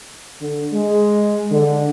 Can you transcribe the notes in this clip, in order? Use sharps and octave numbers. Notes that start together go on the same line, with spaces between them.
D3
G#3
D3